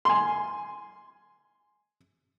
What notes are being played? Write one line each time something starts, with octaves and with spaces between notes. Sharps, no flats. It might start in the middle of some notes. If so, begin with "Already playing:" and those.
G#5 C6